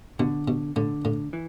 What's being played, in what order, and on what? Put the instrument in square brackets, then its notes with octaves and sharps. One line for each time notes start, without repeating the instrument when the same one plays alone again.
[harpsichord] B2 [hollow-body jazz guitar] D3
[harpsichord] B2
[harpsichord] A2 [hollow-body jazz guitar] D3
[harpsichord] A2
[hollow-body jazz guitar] E3